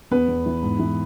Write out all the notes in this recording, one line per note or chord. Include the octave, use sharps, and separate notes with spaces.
E2 B3 B4
E2
E3
G#2
E3